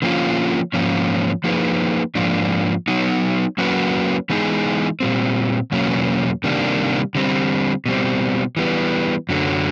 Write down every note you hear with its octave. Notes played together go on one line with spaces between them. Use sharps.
D3 F3 A#3 C#4 F4
G#2 F3 A#3 C#4
F3 A#3 D#4 G#4 B4
G#2 F3 A#3 D4
F#3 B3 D#4
F#3 A#3 C#4 F#4 B4
E3 G#3 B3 D#4 G#4
A#2 G3 C4
E2 B2 F#3 A#3 C#4
C3 D#3 G3 A#3 D4
D3 G3 C4
B2 G3 C4
E3 G3 B3
F#2 D3 F#3